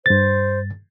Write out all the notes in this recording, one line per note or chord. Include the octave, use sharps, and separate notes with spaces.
G2 C5 A6